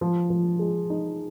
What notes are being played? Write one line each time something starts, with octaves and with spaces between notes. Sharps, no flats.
F3
F3
G#3
D#4